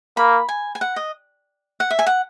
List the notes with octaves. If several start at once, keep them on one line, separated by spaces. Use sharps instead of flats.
A#3 B5
G#5
G#5
F#5
D#5
F#5
E5
G#5
F#5